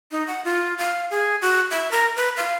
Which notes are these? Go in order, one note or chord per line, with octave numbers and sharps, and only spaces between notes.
D#4
F#5
F4
F5
G#4
F#4
E5
A#4
B4
F5